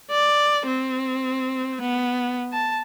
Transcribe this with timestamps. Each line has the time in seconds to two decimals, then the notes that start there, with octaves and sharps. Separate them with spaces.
0.11 D5
0.67 C4
1.81 B3
2.53 A5